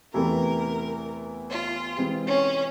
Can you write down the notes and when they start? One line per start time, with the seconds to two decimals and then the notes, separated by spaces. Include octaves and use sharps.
0.14 E2 C3 E3 A3 A#4
1.51 F4
1.97 C3 E3 G#3 C4
2.27 C#4